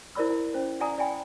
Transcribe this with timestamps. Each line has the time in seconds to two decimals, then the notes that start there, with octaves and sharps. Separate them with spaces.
0.15 E4 A#4 C5 D5 B5 E6
0.30 E4
0.54 C#4 C5
0.80 D5 E5 F#5 G#5 A#5 D#6
0.98 D5 E5 G5 G#5 B5